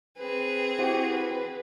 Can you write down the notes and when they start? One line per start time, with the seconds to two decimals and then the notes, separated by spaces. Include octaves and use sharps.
0.18 C4 G#4 B4
0.79 E4 F#4 G4 C5 F#5
1.11 B4